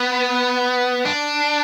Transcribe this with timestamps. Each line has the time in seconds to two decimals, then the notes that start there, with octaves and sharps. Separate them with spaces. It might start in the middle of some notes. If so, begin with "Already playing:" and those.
Already playing: B3
1.05 D4